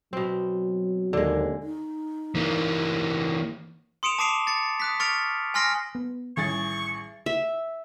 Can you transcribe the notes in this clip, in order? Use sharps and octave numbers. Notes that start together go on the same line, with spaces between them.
B2 F#3 C4
D#2 D3 G#3
D#4
E3 A#3
C6 D#6 C#7 D7 E7 F7
A5 D6 D#6 C7 D7 F7
A6 C#7
D#6 F#6 B6
C#6 F6 A6 C#7 D7 F7
G#5 C6 F6 A#6 C7 D7
B3
A1 D#3 G3 C#4 G#4 C#6 A6
E5